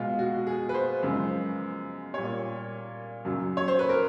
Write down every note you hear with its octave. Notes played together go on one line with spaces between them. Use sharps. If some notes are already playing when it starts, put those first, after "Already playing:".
Already playing: B2 G#3 F4
F#4
G#4
B4
C5
F#2 C#3 F3 G#3
A#2 G3 C#5
F#2 C#3 F#3
C#5
C5
B4
A#4